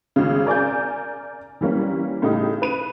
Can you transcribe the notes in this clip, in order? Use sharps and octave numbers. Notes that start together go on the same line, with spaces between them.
G#1 C#3
A#4 D5 G#5 G6
E3 G3 A#3 C#4
A2 C#3 A3 D#4 G4
B4 D#7